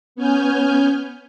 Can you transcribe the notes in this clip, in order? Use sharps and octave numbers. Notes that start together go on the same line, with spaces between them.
B3 C#4 G#5 F6 G6